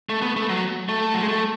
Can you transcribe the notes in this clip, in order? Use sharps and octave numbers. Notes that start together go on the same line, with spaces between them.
A3
B3
A3
F#3
A3
F#3
G#3
A3